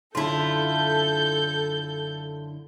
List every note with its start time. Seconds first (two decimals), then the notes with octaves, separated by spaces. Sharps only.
0.15 F#2 D3 E4 F4 A4 A5 G6